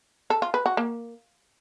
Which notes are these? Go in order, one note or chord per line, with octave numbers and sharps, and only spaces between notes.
A4
F4
B4
F#4
A#3